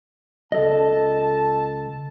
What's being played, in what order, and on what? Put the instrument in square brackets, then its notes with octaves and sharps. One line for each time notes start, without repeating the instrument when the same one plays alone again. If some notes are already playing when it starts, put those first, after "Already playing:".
[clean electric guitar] C#2 A4 D#5 [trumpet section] A5